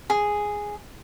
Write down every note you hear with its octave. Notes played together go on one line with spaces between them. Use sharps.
G#4